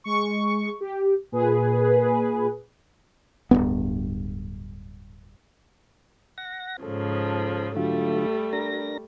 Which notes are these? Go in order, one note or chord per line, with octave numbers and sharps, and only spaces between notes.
G#3 C#6
G4
A#2 G#4 B4
D1 G#1 G2 B3
F#5 A#6
G#2 C#3 F3 A4
D3 F#3 G3 A3 F4
D4 A#4 A#6